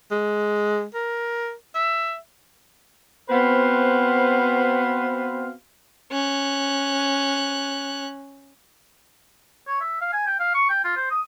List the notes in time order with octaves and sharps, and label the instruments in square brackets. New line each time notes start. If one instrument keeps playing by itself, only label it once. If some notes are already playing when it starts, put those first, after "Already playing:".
[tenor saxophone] G#3
A#4
E5
[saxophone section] B3 C4 F#4 B4 C5 F5
[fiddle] C#4 F#6
[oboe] C#5
E5
F5
G#5
G5
F5
C#6
G5
F4
C5
D#6